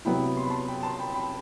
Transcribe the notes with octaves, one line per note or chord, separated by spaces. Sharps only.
C3 F#3 B3 E4 G5 B5
C6
B5
A5 C6
G5 B5
A5 C6
G5 B5
G5 B5